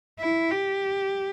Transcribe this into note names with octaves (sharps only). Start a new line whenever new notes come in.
E4
G4